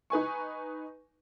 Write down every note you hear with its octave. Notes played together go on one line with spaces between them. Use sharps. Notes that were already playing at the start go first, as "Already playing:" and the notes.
D#4 B4 G#5 C#6